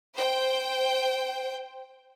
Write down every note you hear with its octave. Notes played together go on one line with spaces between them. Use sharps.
C5 G5